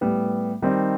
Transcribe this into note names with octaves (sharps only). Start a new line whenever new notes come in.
A2 G3 B3
D#3 G3 C4 D#4